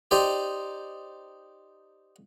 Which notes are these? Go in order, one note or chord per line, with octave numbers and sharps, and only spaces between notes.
D#4 G4 C5 D5